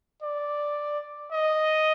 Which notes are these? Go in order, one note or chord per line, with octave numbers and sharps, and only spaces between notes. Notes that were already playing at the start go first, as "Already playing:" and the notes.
D5
D#5